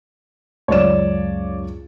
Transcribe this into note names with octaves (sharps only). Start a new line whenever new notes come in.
C#2 F#2 C#5 D5 E7